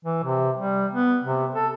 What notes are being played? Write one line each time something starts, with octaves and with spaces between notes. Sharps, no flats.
E3
C3
G3
B3
C3
A4